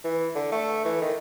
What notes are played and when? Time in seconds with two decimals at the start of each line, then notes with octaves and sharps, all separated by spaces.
0.04 E3
0.35 D3
0.52 A3
0.85 E3
1.02 D#3